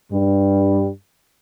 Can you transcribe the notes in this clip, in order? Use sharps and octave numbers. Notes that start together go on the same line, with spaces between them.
G2 G3